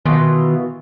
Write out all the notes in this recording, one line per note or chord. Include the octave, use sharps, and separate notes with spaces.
B2 D#3 E3 F4